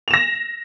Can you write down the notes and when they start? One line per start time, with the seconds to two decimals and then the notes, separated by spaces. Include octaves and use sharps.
0.08 F7
0.11 E7
0.14 A#6